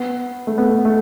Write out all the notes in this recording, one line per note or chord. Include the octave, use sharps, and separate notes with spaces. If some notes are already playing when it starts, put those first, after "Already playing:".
Already playing: B3
A3
B3
A3